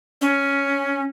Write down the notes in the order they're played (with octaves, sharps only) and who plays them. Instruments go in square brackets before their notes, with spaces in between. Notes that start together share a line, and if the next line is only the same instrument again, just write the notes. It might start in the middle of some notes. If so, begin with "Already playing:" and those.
[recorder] C#4